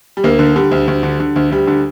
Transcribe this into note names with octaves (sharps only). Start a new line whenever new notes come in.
G3
D2 A#3
D3
D3 G3
D2
D2
D3
D3
D2
D2 G3
D3